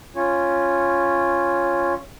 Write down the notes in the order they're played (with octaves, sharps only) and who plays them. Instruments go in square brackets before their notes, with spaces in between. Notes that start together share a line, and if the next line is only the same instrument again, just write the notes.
[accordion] C#4 F4 C#5